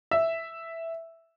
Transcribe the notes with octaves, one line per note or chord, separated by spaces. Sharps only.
E5